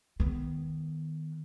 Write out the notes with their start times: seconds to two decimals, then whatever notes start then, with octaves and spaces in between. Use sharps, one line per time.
0.20 D#3 B3